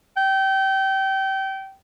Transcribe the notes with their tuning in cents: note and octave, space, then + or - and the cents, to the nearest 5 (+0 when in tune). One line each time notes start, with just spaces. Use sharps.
G5 -25